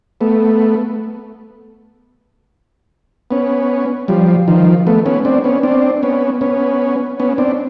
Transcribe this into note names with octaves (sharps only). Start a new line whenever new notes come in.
A3 B3
B3 C#4
F3 G3
D#3 F3
A3 B3
B3 C#4
C4 D4
B3 C#4
C4 D4
B3 C#4
B3 C#4
B3 C#4
C4 D4